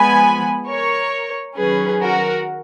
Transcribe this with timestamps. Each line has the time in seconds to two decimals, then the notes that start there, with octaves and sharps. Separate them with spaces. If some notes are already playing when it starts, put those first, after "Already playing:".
Already playing: F3 G#3 B3 G#5 B5
0.68 A#4 C#5
1.57 D#3 F#3 C#4 G#4 B4
2.02 F#4 A#4